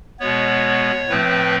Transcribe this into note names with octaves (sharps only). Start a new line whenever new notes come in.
B2 G#3 B3 C#5
A2 F3 A3 C4 B4